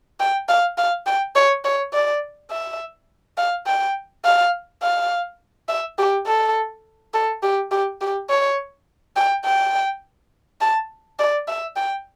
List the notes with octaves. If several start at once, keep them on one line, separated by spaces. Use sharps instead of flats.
G5
F5
F5
G5
C#5
C#5
D5
E5
F5
G5
F5
F5
E5
G4
A4
A4
G4
G4
G4
C#5
G5
G5
A5
D5
E5
G5